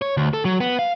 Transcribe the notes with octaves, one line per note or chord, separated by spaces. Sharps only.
C#5
D2
A4
F#3
B3
F5